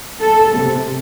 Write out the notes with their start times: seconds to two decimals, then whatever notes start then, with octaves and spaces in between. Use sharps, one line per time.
0.20 A4
0.56 C3